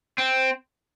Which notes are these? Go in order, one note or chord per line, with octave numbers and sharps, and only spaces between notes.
C4